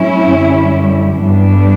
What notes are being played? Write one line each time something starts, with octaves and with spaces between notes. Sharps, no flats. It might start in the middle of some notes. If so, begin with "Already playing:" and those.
Already playing: A2 F#3 C#4 E4
F#2 D3 G3
G2 E3 G3 B3 D4